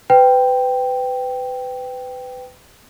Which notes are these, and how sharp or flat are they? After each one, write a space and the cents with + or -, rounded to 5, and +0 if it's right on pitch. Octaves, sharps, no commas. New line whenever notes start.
B4 +30 G5 +0